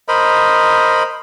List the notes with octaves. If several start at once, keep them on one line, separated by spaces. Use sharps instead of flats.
A#4 C5 D#5 B5